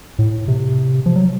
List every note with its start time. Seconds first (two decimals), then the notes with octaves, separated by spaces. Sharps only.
0.19 A2
0.48 C3
1.06 F3
1.16 F#3